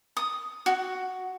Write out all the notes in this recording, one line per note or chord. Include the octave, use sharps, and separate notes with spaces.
D#6
F#4